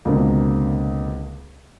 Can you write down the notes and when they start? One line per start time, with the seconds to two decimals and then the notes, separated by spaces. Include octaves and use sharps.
0.05 C#2 B2 D3 A#3 C4